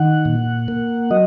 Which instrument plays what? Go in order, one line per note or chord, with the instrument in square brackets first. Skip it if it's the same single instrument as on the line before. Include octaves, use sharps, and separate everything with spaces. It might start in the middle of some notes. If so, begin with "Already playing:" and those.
Already playing: [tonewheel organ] D#3 F#5
A#2
A#3
F#3 D#5